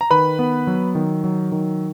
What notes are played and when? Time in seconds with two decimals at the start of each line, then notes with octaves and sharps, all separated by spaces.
0.01 A#5
0.10 D#3 B4 B5
0.39 B3
0.67 F#3
0.95 D#3
1.24 F#3
1.52 D#3